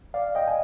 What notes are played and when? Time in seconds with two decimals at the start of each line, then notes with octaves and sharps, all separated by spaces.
0.14 D5 F5
0.35 D#5 G5
0.48 G#5